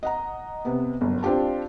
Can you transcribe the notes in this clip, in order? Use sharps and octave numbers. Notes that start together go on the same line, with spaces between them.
D#5 F#5 A#5
C3 B3
G1 F#2
C4 D4 F4 G4 A5